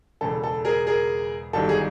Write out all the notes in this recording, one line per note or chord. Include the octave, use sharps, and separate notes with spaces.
E1 E2 C#3 A4
A4
G#4 A#4
G#4 A#4
G1 G2 D#3 F#3 A4
G#4